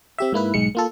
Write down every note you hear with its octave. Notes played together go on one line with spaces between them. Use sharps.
C4 G4 E5
G#2 A#3 E4 B4
B1 G#2 G#3 C#7
A#3 F4 A4